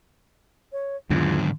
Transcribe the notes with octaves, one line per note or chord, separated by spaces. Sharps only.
C#5
E2 G#2 D3 D#3 F#3 D4 F4